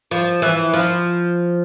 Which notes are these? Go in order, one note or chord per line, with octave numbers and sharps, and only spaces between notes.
F3
E3
F3